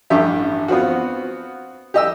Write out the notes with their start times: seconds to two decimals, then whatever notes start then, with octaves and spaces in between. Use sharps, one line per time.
0.10 A1 G2 G4 E5
0.68 B3 C4 F4 F#4
1.94 G4 D#5 E6